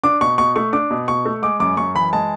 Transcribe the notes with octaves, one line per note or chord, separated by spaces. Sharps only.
D4 D6
B2 C#6
B2 C#6
A3 C#6
D4 D6
B2
B2 C#6
A3
G#3 D6
F#2 D6
F#2 C#6
E3 B5
G#3 A5